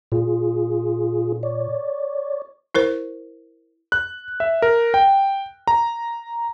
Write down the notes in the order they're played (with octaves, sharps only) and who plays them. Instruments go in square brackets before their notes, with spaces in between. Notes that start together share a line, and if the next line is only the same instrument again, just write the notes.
[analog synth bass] A#2 [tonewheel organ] F4 G#4
[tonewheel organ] C#5 D5
[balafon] E4 A#4 C5
[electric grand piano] F#6
E5
A#4
G5
A#5